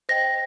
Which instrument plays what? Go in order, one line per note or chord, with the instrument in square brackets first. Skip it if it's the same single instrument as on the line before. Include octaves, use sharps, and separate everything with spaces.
[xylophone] C5 D#5 G5 A#6